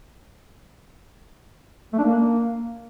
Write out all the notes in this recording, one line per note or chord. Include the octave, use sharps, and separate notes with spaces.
A3
D4
A#3